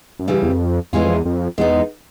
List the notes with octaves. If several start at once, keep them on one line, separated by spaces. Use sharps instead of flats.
F#2
G2 C#3 E3 G3
E2
F2
E2 E3 G#3 C#4 F4
F2
E2
F2
E2 G#3 B3 D#4